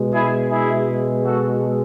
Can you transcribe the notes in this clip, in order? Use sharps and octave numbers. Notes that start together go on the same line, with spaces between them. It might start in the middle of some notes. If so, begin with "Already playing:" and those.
Already playing: B2 G#3
E4 G#4
E4 G#4
F#4 A4